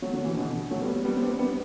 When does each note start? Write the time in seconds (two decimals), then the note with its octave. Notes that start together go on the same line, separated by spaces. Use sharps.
0.02 F#3 A3
0.13 D3 F#3
0.24 C3 E3
0.36 B2 D3
0.71 F#3 A3
0.82 G3 B3
1.05 G3 B3
1.16 C4
1.22 B3 D4
1.39 G3 B3